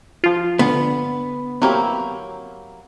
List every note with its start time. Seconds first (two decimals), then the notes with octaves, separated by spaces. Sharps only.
0.24 F3 F4
0.59 D3 B3
1.62 F#3 A#3 C4 E4 G4